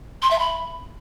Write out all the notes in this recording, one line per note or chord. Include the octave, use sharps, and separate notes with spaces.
C6
E5
B5